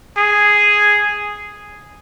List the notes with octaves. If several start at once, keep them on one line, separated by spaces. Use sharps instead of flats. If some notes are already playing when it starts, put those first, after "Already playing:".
G#4